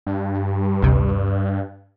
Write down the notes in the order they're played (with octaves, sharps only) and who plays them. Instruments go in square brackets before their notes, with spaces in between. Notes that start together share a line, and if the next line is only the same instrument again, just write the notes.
[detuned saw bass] G2
[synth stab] A1 D2 C3